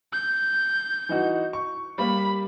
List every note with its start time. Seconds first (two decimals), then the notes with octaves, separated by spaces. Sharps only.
0.13 G6
1.09 E3 D#4 F#4
1.53 C#6
1.98 G3 A#3 B5